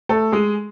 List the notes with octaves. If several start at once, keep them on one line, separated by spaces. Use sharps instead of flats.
A3 A4
G#3 G#4